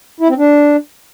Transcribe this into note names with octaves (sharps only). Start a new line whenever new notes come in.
E4
C4
D4